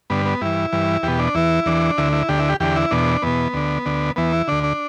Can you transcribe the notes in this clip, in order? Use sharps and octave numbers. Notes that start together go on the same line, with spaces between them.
G2 D3 B3
B3
G2 E3 E4
G2 E3
E2 B2 G4
D4
E2 E3 E4
E2 E3 D4
D2 D3 E4
E4
D2 D3 G4
E4
G4
E2 D3 G4
E4
E2 B2 D4
E2 B2 B3
D2 D3
D2 D3
E2 E3 B3
E4
D2 D3 D4
D4